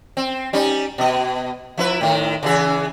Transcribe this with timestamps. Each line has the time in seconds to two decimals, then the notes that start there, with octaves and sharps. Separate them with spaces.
0.17 C4
0.53 G3 C#4 D#4
0.98 B2 D#5
1.77 F3 E4 B4
2.01 A2 D#3
2.43 C#3 E3 G#4